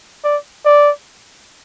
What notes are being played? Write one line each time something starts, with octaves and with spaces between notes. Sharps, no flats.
D5
D5